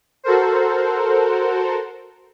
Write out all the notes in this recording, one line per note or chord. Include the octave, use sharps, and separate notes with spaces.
F#4 A4 A#4 C5